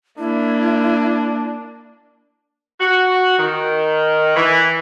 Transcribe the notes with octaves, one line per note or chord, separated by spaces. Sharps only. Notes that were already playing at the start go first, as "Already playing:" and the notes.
A#3 D4 E4
F#4
D#3
E3